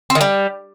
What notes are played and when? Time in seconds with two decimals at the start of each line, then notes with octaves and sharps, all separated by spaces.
0.10 C4
0.15 D#3
0.21 G3